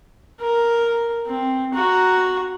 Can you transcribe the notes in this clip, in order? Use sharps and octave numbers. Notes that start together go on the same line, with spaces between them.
A#4
C4
F#4 A#5